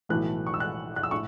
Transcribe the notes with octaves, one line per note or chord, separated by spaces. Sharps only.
B1 A2 E3 A3 F#6
C#6
E6
F#6
F#6
E6
A2 C#6